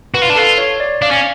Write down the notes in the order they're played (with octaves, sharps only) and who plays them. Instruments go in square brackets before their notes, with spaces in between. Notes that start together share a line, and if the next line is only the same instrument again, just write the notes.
[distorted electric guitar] F#4 [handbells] B4
[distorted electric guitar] F4
D4
[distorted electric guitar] F4 [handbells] A4
[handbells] C#5
D5
[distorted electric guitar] D4 [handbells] F5
[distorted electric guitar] C#4